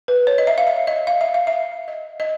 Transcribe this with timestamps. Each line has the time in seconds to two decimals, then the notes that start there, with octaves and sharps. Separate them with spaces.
0.08 B4
0.27 C#5
0.38 D#5
0.47 E5
0.58 F5
0.67 E5
0.87 D#5
1.07 F5
1.21 E5
1.34 F5
1.47 E5
1.88 D#5
2.20 D#5